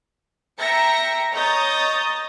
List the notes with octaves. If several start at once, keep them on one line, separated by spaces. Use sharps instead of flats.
E5 G5 A#5 A#6 C#7
C#5 D#5 A#5 D#6 G6 A6